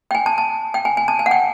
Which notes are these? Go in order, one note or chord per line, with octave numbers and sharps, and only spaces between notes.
G5
G#5
A5
A5
G5
G#5
G#5
A5
G#5
F#5
G5